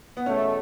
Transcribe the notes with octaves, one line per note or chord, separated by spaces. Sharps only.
B3
E2 B2 A3 C#4